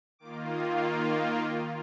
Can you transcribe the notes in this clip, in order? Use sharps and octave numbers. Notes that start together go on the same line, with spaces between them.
D#3 A#3 F4 D6
D#6